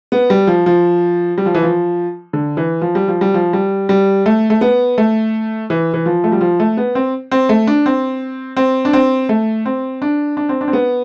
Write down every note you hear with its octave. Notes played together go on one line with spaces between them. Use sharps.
B3
G3
F3
F3
G3
F3
E3
F3
D3
E3
F3
G3
F3
G3
F3
G3
G3
A3
A3
B3
A3
E3
E3
F3
A3
G3
F3
A3
B3
C4
C4
A3
D4
C4
C4
D4
C4
A3
C4
D4
D4
C4
D4
C4
B3